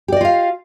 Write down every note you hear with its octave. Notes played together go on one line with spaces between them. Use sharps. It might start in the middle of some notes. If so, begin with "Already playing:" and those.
F4 G4 D5 D#5 F5